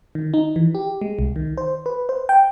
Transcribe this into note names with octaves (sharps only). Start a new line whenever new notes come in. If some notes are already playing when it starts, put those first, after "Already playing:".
D#3
D#4
E3
G4
G#3
C2
D#3
C5
B4
C5
G5